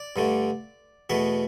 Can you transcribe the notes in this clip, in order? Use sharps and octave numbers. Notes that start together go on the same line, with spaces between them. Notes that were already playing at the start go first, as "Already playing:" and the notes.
Already playing: D5
G2 D3 A3
E2 B2 A3 E5